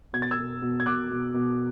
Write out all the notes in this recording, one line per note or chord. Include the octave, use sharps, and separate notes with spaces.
B2 G#6
A6
E6 G#6
B2
B2
G#6
B2 D6 F#6
B2
B2